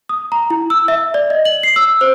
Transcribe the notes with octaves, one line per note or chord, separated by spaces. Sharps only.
D#6
A#5
E4
E6
E5
D5
D#5
F#7
C7
E6
C5